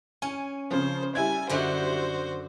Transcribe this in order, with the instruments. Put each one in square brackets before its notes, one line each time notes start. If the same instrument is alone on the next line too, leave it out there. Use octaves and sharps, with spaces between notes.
[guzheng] C#4 [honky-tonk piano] G#5
[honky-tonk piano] C#3 F3 [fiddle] C5
[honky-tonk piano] G3 E4 G#6 [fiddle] G#5
[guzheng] F#2 D3 [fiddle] F#4 C5